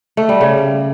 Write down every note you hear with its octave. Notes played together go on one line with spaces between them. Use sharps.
A3
G3
C#3